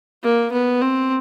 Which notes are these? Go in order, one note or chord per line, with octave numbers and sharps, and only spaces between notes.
A#3
B3
C4